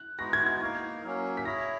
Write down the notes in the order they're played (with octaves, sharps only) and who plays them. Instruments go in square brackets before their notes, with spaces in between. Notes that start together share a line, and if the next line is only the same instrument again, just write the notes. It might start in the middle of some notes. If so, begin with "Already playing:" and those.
Already playing: [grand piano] F#6
[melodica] G#3 B3 D#4 F#4 [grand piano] A#6
[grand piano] G#6
G#6
[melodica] A#3 D#4 A#4
F#3 A#3 C#4
[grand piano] B6
[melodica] E4 G#4 C#5 [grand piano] A#6